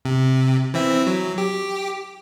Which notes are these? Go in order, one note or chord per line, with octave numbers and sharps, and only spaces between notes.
C3
E3 C4 E5
F#3
G4